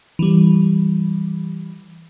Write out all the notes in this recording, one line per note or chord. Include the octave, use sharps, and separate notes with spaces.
E3 G3